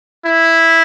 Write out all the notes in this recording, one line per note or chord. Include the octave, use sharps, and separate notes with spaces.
E4